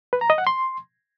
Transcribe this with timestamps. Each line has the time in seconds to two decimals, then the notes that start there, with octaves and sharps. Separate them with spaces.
0.13 B4
0.21 A#5
0.30 D#5
0.38 F#5
0.47 C6